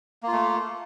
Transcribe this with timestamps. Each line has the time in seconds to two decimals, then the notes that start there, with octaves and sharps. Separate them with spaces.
0.23 A#3
0.28 F4
0.32 A3